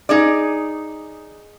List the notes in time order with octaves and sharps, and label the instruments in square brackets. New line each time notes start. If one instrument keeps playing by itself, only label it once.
[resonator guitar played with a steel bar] D#4 G#4 D5